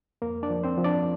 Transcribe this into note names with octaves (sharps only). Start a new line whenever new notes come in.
F2 A#3 A#4
D4 D5
F3
C4 C5
F3
D4 D5